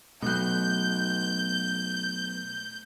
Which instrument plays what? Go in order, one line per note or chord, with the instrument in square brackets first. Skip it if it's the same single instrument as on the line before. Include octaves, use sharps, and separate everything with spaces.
[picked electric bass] B2 F#3 [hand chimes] A3 F#6 [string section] G6